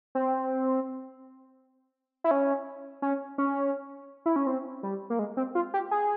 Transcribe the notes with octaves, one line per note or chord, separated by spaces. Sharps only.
C4
E4
C#4
C#4
C#4
E4
C#4
C4
G3
A#3
G#3
C4
F4
G4
G#4